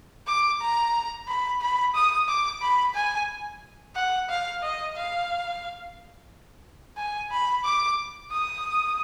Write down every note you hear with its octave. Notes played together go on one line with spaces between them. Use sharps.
D6
A#5
B5
B5
D#6
D6
B5
G#5
F#5
F5
D#5
F5
G#5
B5
D6
D#6